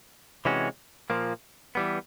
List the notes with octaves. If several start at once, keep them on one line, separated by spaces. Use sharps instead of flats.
C3 E3 G#3 C#4 F#4
A#2 F3 A#3
E3 G3 B3